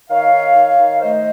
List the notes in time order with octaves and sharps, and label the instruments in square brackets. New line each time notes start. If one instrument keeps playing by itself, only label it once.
[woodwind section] D#3 C#5 F5
D#3
D#3
D#3
A3 C5 D#5